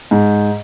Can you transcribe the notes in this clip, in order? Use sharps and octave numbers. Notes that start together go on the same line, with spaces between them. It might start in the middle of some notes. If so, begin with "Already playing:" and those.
G#2